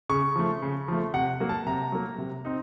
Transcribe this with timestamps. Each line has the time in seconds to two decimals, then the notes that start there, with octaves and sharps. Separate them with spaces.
0.09 C#3 C#6
0.36 F3 A3
0.62 C#3
0.88 F3 A3
1.14 C3 F#5
1.40 F#3 A#3
1.49 A5
1.66 C3 A#5
1.92 F#3 A#3
2.18 C3
2.45 C4 D#4